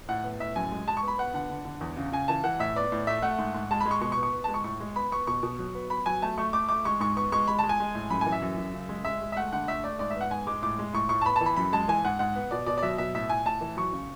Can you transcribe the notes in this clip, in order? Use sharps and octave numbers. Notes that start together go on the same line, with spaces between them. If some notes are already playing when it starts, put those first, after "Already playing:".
A2 F#5
B3
A2 E5
F#2 G#5
G#3
G#3 A5
C#6
B3
B5
B3 F#5
D3 F#5
D3
D3
E2
C#3
C#3 G#5
E3 A5
E3 F#5
A2 E5
B3 D5
A2
A3 E5
A3 F#5
G#2
G#2
G#3 A5
B5
G#3
C#6
B2 C#6
C#6
B3
C#6
B3
G#3 A5
C#6
A2 C#6
G#3
B3 B5
B3 C#6
B2 C#6
B2
F#3
B3
B3 B5
F#3 G#5
A3 A5
A3 C#6
A3 D6
A3 D6
G#3 C#6
G#2 C#6
B3 C#6
G#3 C#6
G#3 B5
G#3 A5
G#5
G#3
A2
F#2 B5
G#5
E3
E5
F#2
F#2
C#3
G#3
G#3 E5
G#3
E5
A3 F#5
D3 F#5
A3 E5
A3 D5
G#2 D5
E5
B3 F#5
G#2 G#5
G#3 D6
A2 D6
G#3
A2 C#6
A2 C#6
A5
B3 B5
A5
E3 B5
F#2 B5
G#3 A5
E3 G#5
G#2 F#5
G#2 F#5
B3
B2 D5
B2 D5
D5
F#3 E5
B2 E5
A2 E5
A2 G#5
A2 A5
E3
F#3 C#6
C#3